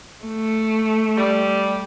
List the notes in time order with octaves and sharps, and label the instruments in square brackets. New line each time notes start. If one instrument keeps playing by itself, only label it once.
[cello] A3
[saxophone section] G3